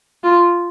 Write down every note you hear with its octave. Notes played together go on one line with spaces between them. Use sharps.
F4